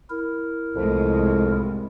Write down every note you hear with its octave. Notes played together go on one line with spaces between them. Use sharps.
E4 A#4
C2 F2 A2 G#3